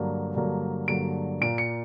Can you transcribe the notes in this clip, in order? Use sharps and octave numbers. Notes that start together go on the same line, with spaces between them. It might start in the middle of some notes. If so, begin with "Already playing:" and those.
Already playing: G2 D3 F#3 A#3
G2 D3 F#3 A#3
G2 D3 F#3 A#3 D7
A#2 A#3 D7
C#7